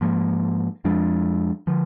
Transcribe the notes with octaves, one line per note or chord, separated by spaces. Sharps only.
G#2 F3 A#3
F2 F3 G#3 D4
D3 F3